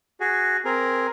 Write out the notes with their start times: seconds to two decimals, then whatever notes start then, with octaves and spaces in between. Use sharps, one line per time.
0.20 F#4 G#4
0.65 C4 G#4 A#4